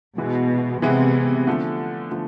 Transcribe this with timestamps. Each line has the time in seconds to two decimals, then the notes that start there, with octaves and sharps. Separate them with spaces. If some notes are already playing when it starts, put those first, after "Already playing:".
0.18 B2 E3 G#3 B3 E4
0.82 C3 E3 G#3 B3 E4
1.47 D3 F3 A3
2.11 D3 F3 A3